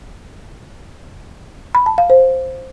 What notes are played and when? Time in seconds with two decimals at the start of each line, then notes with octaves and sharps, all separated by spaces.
1.75 B5
1.86 A5
1.98 F5
2.10 C5